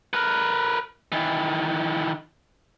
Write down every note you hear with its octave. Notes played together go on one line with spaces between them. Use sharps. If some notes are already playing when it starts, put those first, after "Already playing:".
A#4 B4
D#3 E3